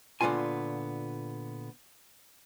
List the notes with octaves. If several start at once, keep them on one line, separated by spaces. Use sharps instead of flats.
A#2 D3 F#3 B3 F4 G#5